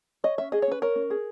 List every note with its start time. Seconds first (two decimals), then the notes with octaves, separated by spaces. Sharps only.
0.24 C#5 D#5
0.38 C#4 E5
0.52 G#4 D#5
0.62 C#5
0.68 C#4 B4
0.82 A#4 C#5
0.96 C#4
1.10 G#4